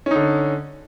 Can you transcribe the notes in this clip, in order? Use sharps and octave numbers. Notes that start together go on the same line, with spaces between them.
D3 C#4 D#4